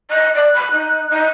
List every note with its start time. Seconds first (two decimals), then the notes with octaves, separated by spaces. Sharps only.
0.11 D#5 F#6
0.34 D5
0.54 B5
0.71 D#4
1.09 D#4